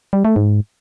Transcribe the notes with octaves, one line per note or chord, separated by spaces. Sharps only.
G3
A3
G#2